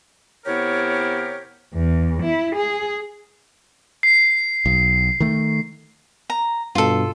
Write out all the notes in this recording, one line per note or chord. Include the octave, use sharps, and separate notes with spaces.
C3 B3 E4 G4 A#4 C#5
E2
E4
G#4
C7
B1
D#3 A3
A#5
G2 B2 F4 A4